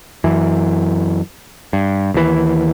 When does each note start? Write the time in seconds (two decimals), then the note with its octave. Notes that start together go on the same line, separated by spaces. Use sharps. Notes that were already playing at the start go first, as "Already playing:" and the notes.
0.24 F#2 E3
1.73 G2
2.14 D#2 E3